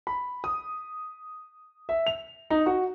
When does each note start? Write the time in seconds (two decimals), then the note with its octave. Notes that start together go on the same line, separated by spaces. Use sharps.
0.07 B5
0.44 D#6
1.89 E5
2.07 F7
2.50 D#4
2.66 F#4